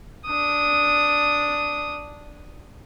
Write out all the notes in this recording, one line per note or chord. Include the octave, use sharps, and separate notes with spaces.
D4 D#6